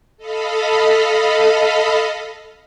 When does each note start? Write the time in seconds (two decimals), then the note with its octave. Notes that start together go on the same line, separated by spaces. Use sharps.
0.17 A4 D#5 F5 B5